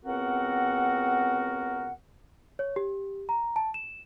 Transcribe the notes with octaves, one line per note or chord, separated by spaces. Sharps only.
C#2 B3 C4 F#4 A#4 F#5
C#5
G4
A#5
A5
E7